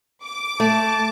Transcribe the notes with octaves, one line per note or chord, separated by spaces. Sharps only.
D6
A3 A5